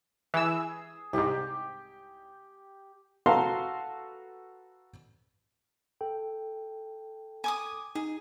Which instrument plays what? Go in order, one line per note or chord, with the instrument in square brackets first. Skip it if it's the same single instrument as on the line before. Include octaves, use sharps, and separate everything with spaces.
[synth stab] E3 E6 [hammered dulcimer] G#4
[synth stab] C2 G#2 [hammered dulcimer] G4 G5
[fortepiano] F#4 A4 B4 F5 A#5 C6
[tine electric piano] A4 G5
[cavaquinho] G#5 D6 D#6
[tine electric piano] D#4 [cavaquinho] G#4